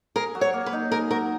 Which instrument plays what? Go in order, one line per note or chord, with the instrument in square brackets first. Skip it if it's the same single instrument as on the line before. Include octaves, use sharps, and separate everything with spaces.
[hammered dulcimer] G#4 [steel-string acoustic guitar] A#4
[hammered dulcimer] F#3
[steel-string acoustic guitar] C#5
[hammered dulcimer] A#3
[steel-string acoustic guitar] B4
[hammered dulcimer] D#4
[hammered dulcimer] G#4 [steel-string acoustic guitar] A#4
[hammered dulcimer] F#3 [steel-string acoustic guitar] A#4